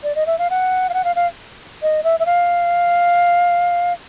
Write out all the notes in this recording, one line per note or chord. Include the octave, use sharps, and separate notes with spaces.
D5
D#5
E5
F5
F#5
F5
F#5
F5
F5
D#5
E5
E5
F5